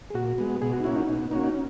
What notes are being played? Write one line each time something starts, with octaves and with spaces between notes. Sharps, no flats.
G#4
A#2 F#4
G#3 B3
B2 G#4
F#4
D#4
A#3 C#4 E4 F#4
D#4
B2 D#4
A#3 C#4 D#4 F#4
D#4
C#4